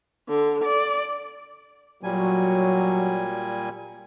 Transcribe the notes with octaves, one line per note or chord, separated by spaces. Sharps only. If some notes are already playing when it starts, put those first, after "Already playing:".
D3
D5
A#2 F#3 G3 G#5